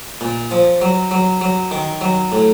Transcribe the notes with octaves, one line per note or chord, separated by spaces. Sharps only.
A#2
F3
F#3
F#3
F#3
D#3
F#3
A2